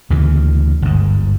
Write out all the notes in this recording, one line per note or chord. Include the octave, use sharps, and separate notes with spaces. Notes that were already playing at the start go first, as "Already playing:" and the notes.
D2 C#3 E3
G1 G#2